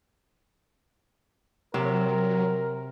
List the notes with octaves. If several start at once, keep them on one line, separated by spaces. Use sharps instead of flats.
C3 F#3 A#4